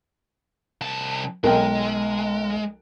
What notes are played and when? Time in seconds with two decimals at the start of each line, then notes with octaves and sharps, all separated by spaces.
0.81 C2 A5
1.44 B1 G#3 A#4 G5